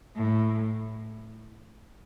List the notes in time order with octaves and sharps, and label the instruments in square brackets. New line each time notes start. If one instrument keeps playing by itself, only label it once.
[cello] A2